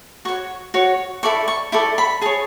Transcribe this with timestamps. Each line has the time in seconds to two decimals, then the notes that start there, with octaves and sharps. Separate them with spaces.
0.25 F#4 C#5 C#6
0.74 F#4 C#5
1.23 E4 A4 D5 C#6
1.48 C#6
1.72 E4 A4 D5 C#6
1.98 B5
2.21 G#4 A5
2.25 C#5